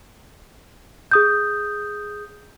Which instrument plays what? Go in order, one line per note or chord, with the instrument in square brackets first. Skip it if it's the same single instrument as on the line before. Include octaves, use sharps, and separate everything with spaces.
[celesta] G#4 D#6 G6